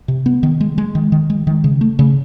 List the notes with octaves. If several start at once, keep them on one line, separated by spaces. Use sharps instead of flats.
C3
B3
D#3
G#3
G#3
D#3
D#3
G#3
D#3
C#3
A3
C#3